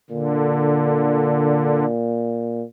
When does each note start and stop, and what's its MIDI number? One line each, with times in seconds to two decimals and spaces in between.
0.10 2.63 46
0.10 1.85 50